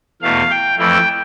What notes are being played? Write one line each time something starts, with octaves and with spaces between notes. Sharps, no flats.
E2 B2 A3 F5
G5
F2 E3 A3 E4 G5